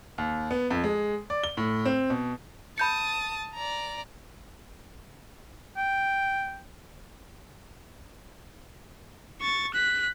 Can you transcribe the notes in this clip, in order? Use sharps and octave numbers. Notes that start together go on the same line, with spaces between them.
D#2
B3
F2
G#3
D5
G7
A2
C4
B2
A5 B5 D#6 G6 C#7
D5 A#5
G5
C#6 A6
F#6 B6